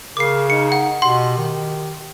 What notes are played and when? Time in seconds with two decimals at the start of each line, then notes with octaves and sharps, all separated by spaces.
0.17 C#3 A#4 D6 C7
0.50 D#4 C#7
0.72 F#5
1.02 B2 G4 F#5 C6
1.37 D#3